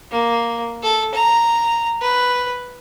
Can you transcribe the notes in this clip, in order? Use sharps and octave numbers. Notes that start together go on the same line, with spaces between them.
A#3
A4
A#5
B4